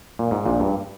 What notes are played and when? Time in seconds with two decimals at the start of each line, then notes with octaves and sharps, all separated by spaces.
0.19 A#2
0.31 G#2
0.46 A#1 A#2
0.60 G2